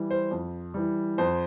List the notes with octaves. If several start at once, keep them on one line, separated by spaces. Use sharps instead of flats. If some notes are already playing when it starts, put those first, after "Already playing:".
Already playing: E3 G3
C5
F2
E3 G3
F2 C5